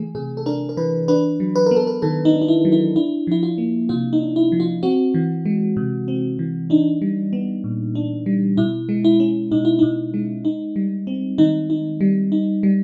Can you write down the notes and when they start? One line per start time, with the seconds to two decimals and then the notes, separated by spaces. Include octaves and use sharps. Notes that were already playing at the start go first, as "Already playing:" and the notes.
Already playing: E3 A3 G#4
0.15 C3 G#4
0.37 A4
0.46 D4 A#4
0.69 A#4
0.77 E3 B4
1.08 D4 B4
1.40 F#3
1.56 B4
1.66 B3 A#4
1.76 A4
1.87 A#4
2.02 D#3 A4
2.25 D#4
2.33 D4
2.42 D#4
2.48 E4
2.65 F#3
2.72 E4
2.96 D4 E4
3.27 F3 E4
3.43 F4
3.58 A#3
3.89 C3 F4
4.13 D#4
4.21 D4
4.36 E4
4.52 F3
4.60 F4
4.83 C4 F#4
5.14 E3
5.46 G#3
5.77 C3
6.08 C4
6.39 E3
6.70 D4 D#4
7.02 G3
7.33 B3
7.64 A#2
7.95 D4
8.26 G3
8.57 B2 E4
8.89 G#3
9.04 E4
9.20 C#4
9.52 B2 D#4
9.65 E4
9.79 B2 D#4
10.14 G#3
10.45 D#4
10.76 G3
11.07 C4
11.38 D#3 D#4
11.70 D#4
12.01 G3
12.32 D#4
12.63 G3